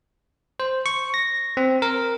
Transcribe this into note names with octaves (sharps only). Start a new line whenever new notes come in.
C5
C#6
A#6
C4
A#4